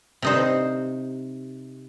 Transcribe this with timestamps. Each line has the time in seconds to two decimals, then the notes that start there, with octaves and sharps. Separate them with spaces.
0.22 C3 D#4 C5